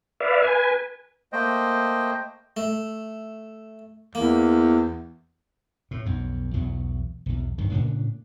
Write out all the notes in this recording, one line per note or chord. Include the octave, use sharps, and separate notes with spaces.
B4 D5 E5 F5
B4 G#5
A3 A#3 C5 D#5 G5
A3
E2 A#3
A2
B1 F2
B1 E2 F#3
B1 E2
D1 G2 D#3
A2 C#3 D4